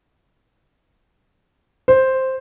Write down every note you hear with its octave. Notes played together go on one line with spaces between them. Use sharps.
C5